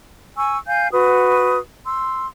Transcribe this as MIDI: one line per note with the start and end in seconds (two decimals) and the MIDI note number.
0.37 0.57 80
0.37 0.57 85
0.37 0.57 88
0.67 0.88 77
0.67 0.88 80
0.67 0.88 91
0.93 1.58 66
0.93 1.58 71
0.93 1.58 87
1.86 2.27 84
1.86 2.27 88